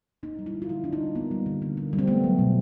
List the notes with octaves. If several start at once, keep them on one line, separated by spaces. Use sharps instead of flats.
A#3 D#4
G3
E4
D3
F4
D3 E4
A#3 D4
D#4
G3
A#3 B3
G3
D3
D3
A#3
G3
C4
A3 B3
F#3
B2